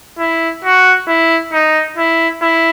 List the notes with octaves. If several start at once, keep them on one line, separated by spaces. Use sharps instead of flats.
E4
F#4
E4
D#4
E4
E4